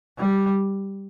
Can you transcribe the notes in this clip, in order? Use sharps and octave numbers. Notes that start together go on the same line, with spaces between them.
G3